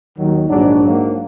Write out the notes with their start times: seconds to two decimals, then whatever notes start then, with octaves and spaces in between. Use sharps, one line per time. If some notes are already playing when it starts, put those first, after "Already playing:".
0.18 D#2 D#3 F#3
0.49 A#1 G#2 F#3 D4
0.81 G#2 F#3 A#3